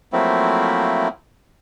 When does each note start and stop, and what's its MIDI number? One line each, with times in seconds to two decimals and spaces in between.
0.13 1.08 53
0.13 1.08 54
0.13 1.08 57
0.13 1.08 58
0.13 1.08 60
0.13 1.08 64